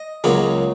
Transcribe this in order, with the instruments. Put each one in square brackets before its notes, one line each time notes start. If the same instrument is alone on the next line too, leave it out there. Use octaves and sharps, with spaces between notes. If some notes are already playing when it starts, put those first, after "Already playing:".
Already playing: [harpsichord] D#5
C#2 C#3 F#3 A#3